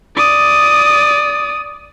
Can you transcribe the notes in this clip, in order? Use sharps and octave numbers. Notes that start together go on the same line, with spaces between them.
D5 D#6